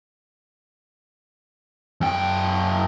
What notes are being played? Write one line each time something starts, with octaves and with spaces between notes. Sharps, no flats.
F#2 G5